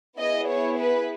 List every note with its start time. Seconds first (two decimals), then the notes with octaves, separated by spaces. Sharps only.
0.18 B3 E4 G#4 D#5
0.49 C#5
0.79 B4